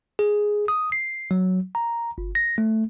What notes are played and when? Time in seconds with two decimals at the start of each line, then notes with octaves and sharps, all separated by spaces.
0.19 G#4
0.68 D#6
0.92 C7
1.31 F#3
1.75 A#5
2.18 G1
2.35 A#6
2.58 A3